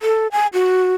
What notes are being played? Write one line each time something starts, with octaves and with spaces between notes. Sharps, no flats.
A4
G#5
F#4